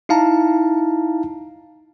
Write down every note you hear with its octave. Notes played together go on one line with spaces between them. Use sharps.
D#4 E4 F5 A5 A#5